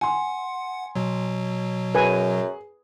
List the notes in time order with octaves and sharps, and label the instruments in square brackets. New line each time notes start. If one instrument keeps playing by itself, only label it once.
[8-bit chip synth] F#5 [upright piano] G#5 C6
[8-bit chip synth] B2 F#3
[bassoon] F#2 [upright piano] G#4 [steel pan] B4 G#5